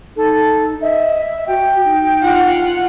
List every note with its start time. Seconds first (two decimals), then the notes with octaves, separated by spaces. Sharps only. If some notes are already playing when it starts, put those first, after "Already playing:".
0.16 D#4 A4
0.82 D#5 E5
1.47 F#4 G5
1.84 D#4
2.22 F4 F#5